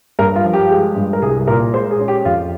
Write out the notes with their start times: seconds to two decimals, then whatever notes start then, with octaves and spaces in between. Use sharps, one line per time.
0.19 G2 A#4
0.36 F4
0.44 F3
0.53 G4
0.70 G#3
0.96 G2
1.13 A#4
1.22 C2 G#4
1.47 A#2 A#4
1.73 G#3 C5
1.91 G#4
2.00 C#4
2.08 G4
2.25 F2 F4